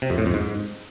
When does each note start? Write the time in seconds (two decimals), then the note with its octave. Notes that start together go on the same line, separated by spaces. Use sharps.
0.02 C3
0.10 F2
0.18 A2
0.26 F2
0.34 G#2